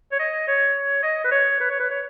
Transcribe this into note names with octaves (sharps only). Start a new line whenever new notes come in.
C#5
D#5
C#5
D#5
B4
C#5
B4
C#5
B4
C#5